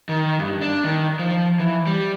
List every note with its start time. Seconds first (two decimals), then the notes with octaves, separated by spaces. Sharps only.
0.09 D#3
0.39 G2
0.61 D4
0.84 D#3
1.19 F3
1.60 E3
1.87 G3